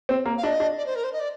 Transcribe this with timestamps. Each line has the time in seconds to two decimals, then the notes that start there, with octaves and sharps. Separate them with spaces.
0.09 C4
0.26 A#3
0.37 F5
0.43 D4 D#5
0.60 D4
0.77 D5
0.86 C5
0.95 A#4
1.03 C5
1.12 D#5
1.19 D5